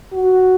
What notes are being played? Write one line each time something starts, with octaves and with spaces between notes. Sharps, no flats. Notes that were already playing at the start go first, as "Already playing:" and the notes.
F#4